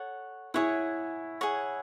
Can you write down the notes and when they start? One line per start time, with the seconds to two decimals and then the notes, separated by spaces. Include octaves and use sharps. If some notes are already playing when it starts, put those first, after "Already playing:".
Already playing: A4 C#5 F#5
0.54 E4 G#4 C#5 F#5
1.41 G#4 C#5 F#5